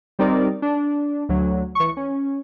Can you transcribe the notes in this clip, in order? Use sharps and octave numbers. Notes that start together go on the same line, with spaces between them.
G3 C4 D#4 A#4 D5
D4
D2 F#3
E3 C#6
C#4